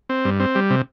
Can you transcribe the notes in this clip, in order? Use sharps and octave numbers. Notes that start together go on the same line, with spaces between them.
C4
G2
C4
G3
C3